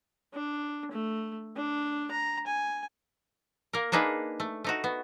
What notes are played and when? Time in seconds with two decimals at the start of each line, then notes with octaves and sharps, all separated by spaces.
0.33 D4
0.91 A3
1.56 D4
2.11 A#5
2.47 G#5
3.73 A#3 A#4
3.92 A#3 D4 D#4 G#4 B4
4.40 A3
4.64 A3 D#4 F#4
4.84 B3